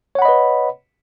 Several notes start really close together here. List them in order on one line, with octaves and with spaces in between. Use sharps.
C#5 F#5 B5 D#5 B4